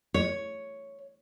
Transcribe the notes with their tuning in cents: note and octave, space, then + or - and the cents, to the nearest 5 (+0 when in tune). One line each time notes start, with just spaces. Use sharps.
C#5 +5